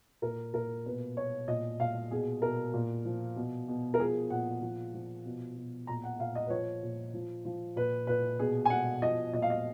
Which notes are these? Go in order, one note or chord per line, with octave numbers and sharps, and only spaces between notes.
A#2 A#4
A#2 A#4
B2 B4
B2 C#5
A#2 D#5
A#2 F5
B2 G#4
B2 A#4
A#2
F3
B2
B2
A#4
F3 G#4
A#2 F#5
F3
F3
B2
B2
A#2 A#5
F#5
A#2 F5
D#5
B4
F3 C#5
A#2
F3
F3
A#2 B4
A#2 B4
B2 G#4
G#5
B2 F#5
F3 D#5
A#2 D#5
F5
D#5